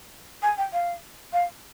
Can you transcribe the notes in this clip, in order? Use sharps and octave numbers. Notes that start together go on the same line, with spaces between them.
G#5
G5
F5
F5